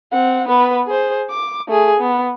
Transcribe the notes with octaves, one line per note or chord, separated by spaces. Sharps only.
C4 F#5
B3 B4
G#4 C5
D6
A3 G#4
B3